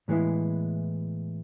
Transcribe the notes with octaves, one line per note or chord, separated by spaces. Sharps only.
A2 E3 G#3 B3 E4